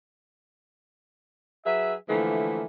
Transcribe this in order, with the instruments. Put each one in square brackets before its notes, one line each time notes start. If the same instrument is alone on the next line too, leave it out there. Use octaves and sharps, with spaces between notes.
[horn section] F#3 G#4 B4 E5
D3 E3 F3 A3 A#3